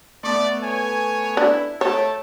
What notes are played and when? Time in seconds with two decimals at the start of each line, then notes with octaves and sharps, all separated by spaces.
0.24 A3 B3 D5
0.63 C#5 G#5
1.37 D4 E4
1.81 A3 C#5 G5 A5